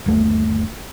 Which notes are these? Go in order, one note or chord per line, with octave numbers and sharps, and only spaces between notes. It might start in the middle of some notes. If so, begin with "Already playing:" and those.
G1 D#2 A3